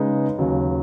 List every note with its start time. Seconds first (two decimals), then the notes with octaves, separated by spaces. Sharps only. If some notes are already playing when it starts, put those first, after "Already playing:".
Already playing: C#3 G#3 D#4 B4 D#5
0.39 D#2 C#3 F#3